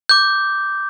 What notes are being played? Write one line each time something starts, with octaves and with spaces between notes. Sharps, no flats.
D6 G6